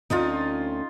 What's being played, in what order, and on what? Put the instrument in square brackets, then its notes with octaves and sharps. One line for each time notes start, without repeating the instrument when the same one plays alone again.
[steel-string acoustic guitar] D2 C4 C#4 [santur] D#4 F4